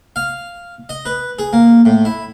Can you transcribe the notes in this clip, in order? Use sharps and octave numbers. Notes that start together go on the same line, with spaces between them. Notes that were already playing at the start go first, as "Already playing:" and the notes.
F5
D#5
B4
G#4
A#3
A2
E4